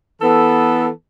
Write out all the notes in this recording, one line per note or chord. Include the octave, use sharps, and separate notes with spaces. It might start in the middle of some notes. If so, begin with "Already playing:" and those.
E3 B3 A4